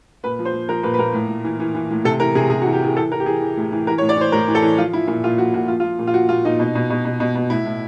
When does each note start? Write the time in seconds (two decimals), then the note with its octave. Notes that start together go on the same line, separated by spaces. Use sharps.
0.24 A#2 B4
0.39 F3
0.45 C5
0.53 F3
0.69 F3 A#4
0.83 A#2 B4
0.94 B4
0.99 A#2 A#4
1.14 A2
1.29 A2
1.44 E3
1.59 E3
1.75 E3
1.90 A2
2.05 C3 A4
2.20 E3 A#4
2.35 C3 G#4
2.50 C3 G#4
2.62 F#4
2.65 E3
2.73 G4
2.81 E3 G#4
2.96 E3 A4
3.11 E3 A#4
3.20 G4
3.26 E3 G#4
3.41 E3
3.57 A2
3.72 E3
3.87 E3 A#4
3.98 C#5
4.02 A2
4.09 D5
4.17 E3 C5
4.32 A2 A#4
4.48 E3
4.55 A4
4.62 E3
4.77 F3 F4
4.93 F3 E4
5.07 A#2 E4
5.24 A#2 F4
5.38 F3 F#4
5.53 A#2 F#4
5.68 F3 F4
5.80 F4
5.83 F3
5.99 A#2
6.07 F4
6.14 F3 F#4
6.29 A#2 F4
6.45 A#2 D#4
6.60 B2
6.75 B2
6.90 B2
7.05 B2
7.20 B2
7.35 B2
7.50 A2 E4
7.65 A2